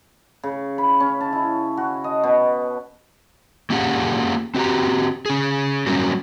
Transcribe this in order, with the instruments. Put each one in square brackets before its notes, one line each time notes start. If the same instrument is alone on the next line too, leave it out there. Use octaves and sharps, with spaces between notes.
[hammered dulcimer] C#3
B5
C#4
A5
E4
F#4
D#5
B2
[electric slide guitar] A#3 C#4 F4 G4 G#4 F#5
C4 F#4 G4 A#5
C#4 G#4
F#3 G3 A#3 B3 C#4